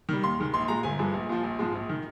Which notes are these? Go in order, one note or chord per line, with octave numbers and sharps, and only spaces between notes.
D#3 G3
D#2 C6
D#3 G#3
A#1 C6
A#2 G#3 A#5
G1 G#5
G2 F3 G#3
A#1
A#2 F3
A#1
G#2 F3 G#3
A#1
D#3